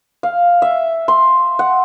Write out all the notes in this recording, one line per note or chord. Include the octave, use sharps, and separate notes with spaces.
F5
E5
C6
F#5